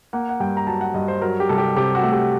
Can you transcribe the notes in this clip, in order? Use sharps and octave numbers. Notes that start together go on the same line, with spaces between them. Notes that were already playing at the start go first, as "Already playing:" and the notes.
A#3 F#5
F#5
G2 G5
A#5
F#3 A5
F#5
G2 D#5
C5
F#3 A#4
G4
C2 A4
G4
C3 G4
F#4
A3
G4